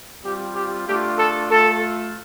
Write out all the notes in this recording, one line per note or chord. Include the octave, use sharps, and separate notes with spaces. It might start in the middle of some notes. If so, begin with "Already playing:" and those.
G3 C4 F4 G4
G4
A3 D4 F4 G4
A4
A3 F4 A4